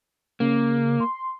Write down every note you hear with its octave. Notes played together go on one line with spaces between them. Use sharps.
C#3 A#3
C6